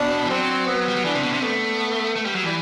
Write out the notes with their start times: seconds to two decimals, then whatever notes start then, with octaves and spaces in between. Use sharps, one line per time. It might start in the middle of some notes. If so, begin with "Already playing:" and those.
Already playing: B2 D4
0.26 E3
0.30 F#3 C4
0.67 B3
0.88 G3
0.95 F#3
1.05 E3 D4
1.14 C3
1.23 B2
1.32 C3
1.42 A3 B3
1.79 B3
2.16 A3
2.25 G3
2.35 F#3
2.43 E3 G3